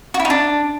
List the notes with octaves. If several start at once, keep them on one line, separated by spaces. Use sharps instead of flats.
F#4
E4
D#4
D4